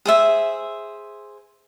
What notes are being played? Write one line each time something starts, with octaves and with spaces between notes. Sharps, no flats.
G#4 C5 E5